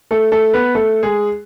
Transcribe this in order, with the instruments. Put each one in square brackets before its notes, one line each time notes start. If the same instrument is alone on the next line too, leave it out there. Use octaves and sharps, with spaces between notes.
[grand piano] A3 A4
A3 A4
B3 B4
A3 A4
G#3 G#4